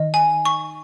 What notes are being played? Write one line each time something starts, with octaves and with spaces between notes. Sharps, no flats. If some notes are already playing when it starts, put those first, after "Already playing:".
Already playing: D#3 D#5
G#5
C#6